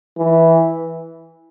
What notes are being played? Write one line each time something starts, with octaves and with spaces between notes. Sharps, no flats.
E3